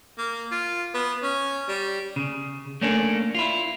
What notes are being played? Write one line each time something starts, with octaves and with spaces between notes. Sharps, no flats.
A#3
F4
B3
C#4
G3
C#3
A3 A#3 C#4 D4
E4 F4